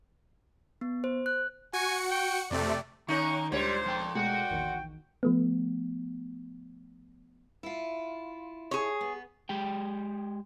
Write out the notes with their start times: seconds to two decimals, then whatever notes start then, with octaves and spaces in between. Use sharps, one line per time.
0.81 B3
1.04 C5
1.26 F#6
1.73 F#4 G#5 C#7
2.10 G5
2.51 F2 C3 A3 D5
3.08 D#3 A#3 C#4 D#4 E5 C#6 F#6 G6
3.52 D2 A#2 G3 G#3 D4 C5 C#5
3.86 F3 G5
4.15 B2 G#3 A3 F#4 G5
4.50 A#1 E2 D#3
5.23 F3 A3 B3
7.63 E4 F4
8.71 G#4 C#5
9.01 B3
9.49 G#3 G4 G5